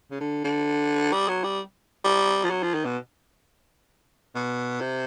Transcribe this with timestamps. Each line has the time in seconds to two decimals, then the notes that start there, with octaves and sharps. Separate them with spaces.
0.11 C#3
0.20 D3
0.44 D3
1.12 G3
1.28 F#3
1.44 G3
2.05 G3
2.44 F3
2.50 F#3
2.63 F3
2.74 D#3
2.85 B2
4.35 B2
4.81 C3